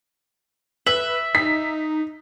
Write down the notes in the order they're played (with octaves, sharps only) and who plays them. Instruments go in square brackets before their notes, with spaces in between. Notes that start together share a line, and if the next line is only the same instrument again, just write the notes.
[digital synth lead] B4 [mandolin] E5 [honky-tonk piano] F#7
[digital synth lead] D#4 [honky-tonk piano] B6